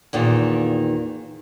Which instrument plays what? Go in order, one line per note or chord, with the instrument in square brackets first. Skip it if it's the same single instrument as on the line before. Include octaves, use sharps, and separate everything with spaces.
[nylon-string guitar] E2 A#2 D#3